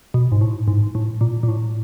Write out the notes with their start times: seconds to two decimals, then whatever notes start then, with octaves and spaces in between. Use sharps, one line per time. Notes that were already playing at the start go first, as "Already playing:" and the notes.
0.14 B2
0.32 G#2
0.41 A2
0.68 G#2
0.95 A2
1.21 A#2
1.43 A#2
1.48 A2